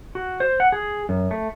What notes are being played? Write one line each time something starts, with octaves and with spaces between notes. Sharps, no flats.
F#4
C5
F#5
G#4
F#2
A3